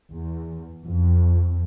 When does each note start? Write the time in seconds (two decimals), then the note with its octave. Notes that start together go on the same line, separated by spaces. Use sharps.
0.11 E2
0.83 F2